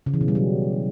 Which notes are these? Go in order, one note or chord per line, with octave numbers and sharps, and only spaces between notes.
C#3
E3
B2
G3
F#3